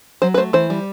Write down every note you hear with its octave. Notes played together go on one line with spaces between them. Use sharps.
F#3 C5
B4
A3 C5
E3 C5
G3